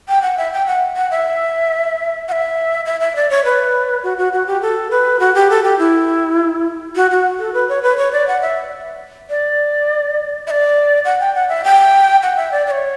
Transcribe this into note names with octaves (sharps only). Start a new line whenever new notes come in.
G5
F#5
E5
G5
F#5
F#5
E5
F#5
E5
E5
E5
D5
C#5
B4
F#4
F#4
F#4
G4
A4
B4
F#4
G4
A4
G4
E4
F#4
F#4
A4
B4
C#5
B4
C#5
D5
F#5
E5
D5
E5
D5
F#5
G5
F#5
E5
G5
F#5
E5
D5
D5
C#5